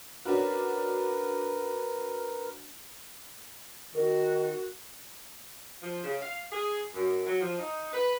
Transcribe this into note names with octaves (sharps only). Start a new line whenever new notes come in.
C#4 D4 F#4 A#4 B4
D#3 F#4 A#4
F3
C#3
F5
G#4
F#2
F#3
F3
D#4
B4